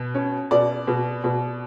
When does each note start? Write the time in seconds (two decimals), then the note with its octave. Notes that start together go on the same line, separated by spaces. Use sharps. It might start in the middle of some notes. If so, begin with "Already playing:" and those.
Already playing: B2
0.15 C#4
0.51 B2 D5
0.87 B2
1.24 B2